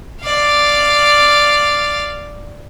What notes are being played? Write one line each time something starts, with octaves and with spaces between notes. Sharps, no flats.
D5 F5